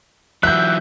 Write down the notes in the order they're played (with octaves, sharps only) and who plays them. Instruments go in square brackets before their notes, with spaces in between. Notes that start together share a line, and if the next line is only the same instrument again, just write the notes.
[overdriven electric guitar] E3 F#3 [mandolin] E5 [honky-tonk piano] F#6 G6